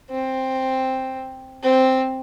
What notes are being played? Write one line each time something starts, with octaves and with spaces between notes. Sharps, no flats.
C4
C4